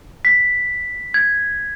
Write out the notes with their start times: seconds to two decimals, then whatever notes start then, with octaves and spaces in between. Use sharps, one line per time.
0.25 B6
1.14 G#6